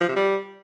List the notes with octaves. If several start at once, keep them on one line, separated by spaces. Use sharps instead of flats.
F3
C3
G3